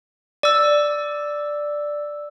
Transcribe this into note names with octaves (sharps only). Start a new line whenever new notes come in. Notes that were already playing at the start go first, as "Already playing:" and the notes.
D5 E6